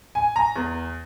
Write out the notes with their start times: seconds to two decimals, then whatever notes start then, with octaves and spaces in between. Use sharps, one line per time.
0.15 G#5
0.36 A#5
0.56 E2